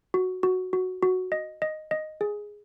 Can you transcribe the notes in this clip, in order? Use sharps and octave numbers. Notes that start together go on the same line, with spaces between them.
F#4
F#4
F#4
F#4
D#5
D#5
D#5
G#4